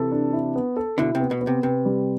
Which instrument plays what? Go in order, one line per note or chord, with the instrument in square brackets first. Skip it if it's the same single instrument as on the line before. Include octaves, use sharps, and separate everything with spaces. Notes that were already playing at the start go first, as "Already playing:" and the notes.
Already playing: [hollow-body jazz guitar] C3 E3 [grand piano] A4
[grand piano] D4
E4
B3
A4
[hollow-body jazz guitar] B2 D3 [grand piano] E4
[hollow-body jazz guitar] C3
[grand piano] B3
[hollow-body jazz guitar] B2
[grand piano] B3
[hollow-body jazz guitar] C3
[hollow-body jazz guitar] C3 [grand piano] B4
[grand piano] G3